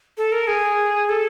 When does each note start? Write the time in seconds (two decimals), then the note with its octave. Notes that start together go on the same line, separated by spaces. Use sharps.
0.18 A4
0.32 A#4
0.47 G#4
1.09 A4